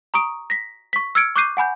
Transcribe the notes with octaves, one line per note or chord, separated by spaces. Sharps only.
A#5 C#6 D#6 D7
A#6 B6
C#6 B6
E6 F6 G#6 C#7 D7
C#6 D6 F#6 G6 C7 D#7
F#5 G#5 B5 G6